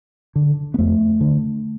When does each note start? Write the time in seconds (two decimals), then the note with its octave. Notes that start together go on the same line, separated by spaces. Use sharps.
0.35 D3
0.74 B3
0.78 F2 A3
1.21 D3